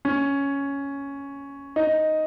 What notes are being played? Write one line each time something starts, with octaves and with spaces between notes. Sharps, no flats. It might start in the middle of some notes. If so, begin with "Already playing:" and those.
C#4
D#4